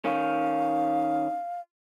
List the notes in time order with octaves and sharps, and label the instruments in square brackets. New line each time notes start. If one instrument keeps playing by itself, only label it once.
[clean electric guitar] D#3 C#4 [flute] F5